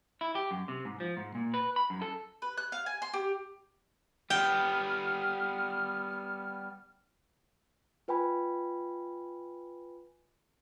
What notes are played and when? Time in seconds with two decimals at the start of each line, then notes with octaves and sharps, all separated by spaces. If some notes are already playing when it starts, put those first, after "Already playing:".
0.21 E4
0.35 G4
0.51 F#2
0.68 C3
0.85 G#2
1.00 F3
1.17 G#2
1.35 A#2
1.54 B4
1.76 B5
1.90 F#2
2.02 A4
2.42 B4
2.57 F#6
2.72 F5
2.86 G#5
3.02 C6
3.14 G4
4.30 G3 B3 G5 F6
8.08 F4 B4 G5 G#5 B5